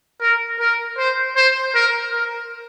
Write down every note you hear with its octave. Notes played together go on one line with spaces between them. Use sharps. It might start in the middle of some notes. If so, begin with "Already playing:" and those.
A#4
A#4
C5
C5
A#4
A#4